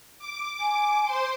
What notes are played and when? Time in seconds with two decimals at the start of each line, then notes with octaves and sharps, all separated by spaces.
0.19 D6
0.60 G#5
1.05 C5 C6